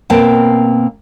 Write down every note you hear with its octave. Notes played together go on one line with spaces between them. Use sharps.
B2 A#3 C4 G5 A5